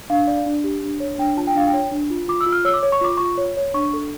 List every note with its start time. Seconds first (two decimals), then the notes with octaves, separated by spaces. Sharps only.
0.10 D4 F5
0.27 D5
0.46 D4
0.64 G4
0.83 D4
1.00 C#5
1.18 D4 G5
1.37 F4 A5
1.47 G5
1.55 D4 F5
1.67 G5
1.73 C#5
1.92 D4
2.10 F4
2.28 F4 D6
2.41 E6
2.46 F4
2.52 F6
2.65 C#5 E6
2.74 D6
2.83 C#5
2.92 C#6
3.01 F4 D6
3.17 F4 C#6
3.37 C#5
3.57 C#5
3.74 D4 C#6
3.93 A4